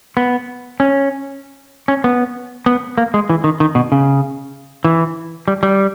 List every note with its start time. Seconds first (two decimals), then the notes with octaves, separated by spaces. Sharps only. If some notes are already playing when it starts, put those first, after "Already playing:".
0.17 B3
0.80 C#4
1.88 C#4
2.04 B3
2.66 B3
2.98 A#3
3.14 G#3
3.30 E3
3.44 D#3
3.60 D#3
3.75 B2
3.92 C#3
4.84 E3
5.48 G3
5.63 G3